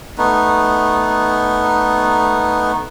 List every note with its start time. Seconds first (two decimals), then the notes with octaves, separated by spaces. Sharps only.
0.18 A3 B3 D#4